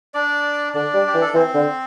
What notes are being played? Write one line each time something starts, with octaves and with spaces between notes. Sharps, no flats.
D4 D5
D3 D4 D5
G3
G4
E3
A4
E3 C4 C5
D3